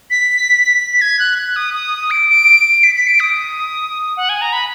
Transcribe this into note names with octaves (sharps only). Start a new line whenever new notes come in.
B6
G#6
F#6
F#6
D#6
D#6
D7
D7
B6
B6
D7
D#6
F#5
G#5
A#5
B5